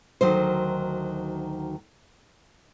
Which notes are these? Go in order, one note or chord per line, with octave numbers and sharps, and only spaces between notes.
D2 D#3 F#3 C5